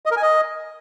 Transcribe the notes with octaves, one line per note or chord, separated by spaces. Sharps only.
D#5
A#4
G#5
D#5